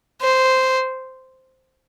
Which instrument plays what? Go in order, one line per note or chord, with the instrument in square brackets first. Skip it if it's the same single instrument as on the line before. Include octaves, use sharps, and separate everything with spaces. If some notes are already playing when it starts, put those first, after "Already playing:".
[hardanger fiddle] C5